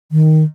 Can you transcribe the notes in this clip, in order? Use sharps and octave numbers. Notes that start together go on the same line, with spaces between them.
D#3